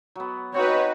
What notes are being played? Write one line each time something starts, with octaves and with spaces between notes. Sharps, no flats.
F#3 B3
C4 D#4 F#4 B4 C#5